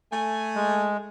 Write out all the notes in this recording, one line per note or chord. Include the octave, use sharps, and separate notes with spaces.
A3 G#5
G#3